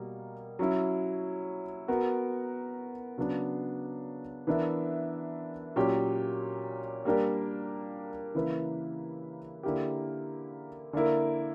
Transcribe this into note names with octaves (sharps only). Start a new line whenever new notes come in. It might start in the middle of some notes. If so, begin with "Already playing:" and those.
Already playing: B2 G3 A#3
F#3 C#4 E4
B3 F#4 A#4
C#3 F#3 B3 D4
E3 B3 D4 A#4 E5
A#2 F#3 C#4 G4
G3 A#3 D4 G4 A#4
C#3 E3 A#3 E4 B4
D3 A#3 E4 G4
D3 A#3 E4 A#4